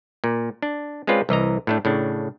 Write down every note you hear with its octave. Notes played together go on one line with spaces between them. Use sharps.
A#2
D4
G#3 C4 C#4 F4 B4 D5
C2 E3 D#5 A#5
A2 A3 D4
A2 C#3 D4